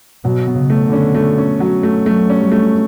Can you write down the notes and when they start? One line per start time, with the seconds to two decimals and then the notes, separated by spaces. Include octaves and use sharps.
0.24 B2 F#3
0.47 B2
0.54 C#3
0.70 A3
0.85 D3
0.93 C#4
1.15 A3
1.38 C#4
1.60 F#3
1.83 A3
2.06 F#3 A3
2.30 C#4
2.36 G3
2.52 A3